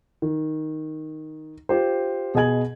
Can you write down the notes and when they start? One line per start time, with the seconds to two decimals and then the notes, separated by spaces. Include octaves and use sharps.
0.22 D#3
1.69 F4 G4 C5
2.34 B2 G#4 D#5 G#5 G#6 F#7